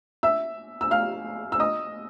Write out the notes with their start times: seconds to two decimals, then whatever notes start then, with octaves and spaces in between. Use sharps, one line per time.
0.23 E5 E6
0.81 E6
0.91 F5 F6
1.52 E6
1.60 D#5 D#6